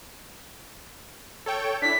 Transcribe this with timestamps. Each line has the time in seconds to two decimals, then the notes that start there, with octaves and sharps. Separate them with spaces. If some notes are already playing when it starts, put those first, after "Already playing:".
1.46 A4 C#5 G5
1.82 D4 E4 B6